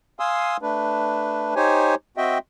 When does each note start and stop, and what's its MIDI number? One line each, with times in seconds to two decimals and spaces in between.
0.20 0.57 77
0.20 0.57 80
0.20 0.57 84
0.20 0.57 87
0.20 0.57 88
0.62 1.54 57
0.62 1.54 62
0.62 1.54 71
1.56 1.95 63
1.56 1.95 67
1.56 1.95 72
1.56 1.95 73
1.56 1.95 80
2.17 2.38 60
2.17 2.38 66
2.17 2.38 75
2.17 2.38 76
2.17 2.38 79